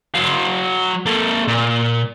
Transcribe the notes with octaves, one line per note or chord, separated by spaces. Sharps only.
F#3 F5
A#3 A4
A#2